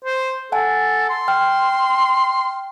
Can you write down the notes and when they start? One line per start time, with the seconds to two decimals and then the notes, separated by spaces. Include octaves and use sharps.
0.05 C5
0.52 A4 F#5 G#5 A5
1.10 C6
1.28 G5 F6